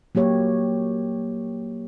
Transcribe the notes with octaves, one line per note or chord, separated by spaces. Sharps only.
F#3 A#3 G4 C#5